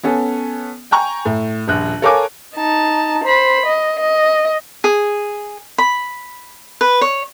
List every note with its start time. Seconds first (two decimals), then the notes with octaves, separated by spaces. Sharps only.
0.03 B3 C#4 A4
0.91 G5 G#5 A#5 C#6
1.25 A2
1.67 D#1 A#1 F#6
2.02 A4 A#4 C#5 F5 G#5 D6
2.56 D#4 A5
3.24 C5 B5
3.66 D#5
3.99 D#5
4.84 G#4
5.78 B5
6.81 B4
7.01 C#5